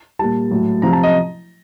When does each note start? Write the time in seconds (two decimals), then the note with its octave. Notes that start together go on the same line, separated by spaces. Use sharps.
0.19 A#2 G3 A5
0.51 A2 F#3
0.82 C3 F3 A#5
0.93 A5
1.03 D#5